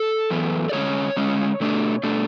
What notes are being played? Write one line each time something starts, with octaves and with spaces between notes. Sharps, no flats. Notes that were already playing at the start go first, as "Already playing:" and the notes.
Already playing: A4
F#2 E3 B3
D5
D3 G#3 C#4 C#5
D3 G#3 C#4
B2 A3 D4
B2 A3 D4